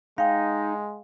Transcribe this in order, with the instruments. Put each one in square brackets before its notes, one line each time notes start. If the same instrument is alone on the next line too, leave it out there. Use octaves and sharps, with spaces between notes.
[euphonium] G#3 [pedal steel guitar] D#4 [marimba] F5 G5